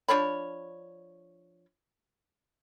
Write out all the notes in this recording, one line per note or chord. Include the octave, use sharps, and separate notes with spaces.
F3 D4 C#5 B5